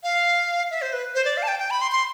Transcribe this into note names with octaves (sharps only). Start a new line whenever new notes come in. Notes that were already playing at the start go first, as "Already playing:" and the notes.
F5
E5
C5
B4
C5
D5
F5
A5
G5
G5
B5
C6
C6